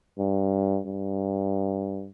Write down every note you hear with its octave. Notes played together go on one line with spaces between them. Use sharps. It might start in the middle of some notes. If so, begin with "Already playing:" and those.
G2
G2